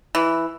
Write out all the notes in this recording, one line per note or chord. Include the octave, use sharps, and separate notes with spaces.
E3